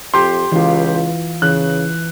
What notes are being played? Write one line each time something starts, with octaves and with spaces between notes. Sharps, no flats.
F2 G4 C6
C#2 E3 F4
C#3 E3 F#6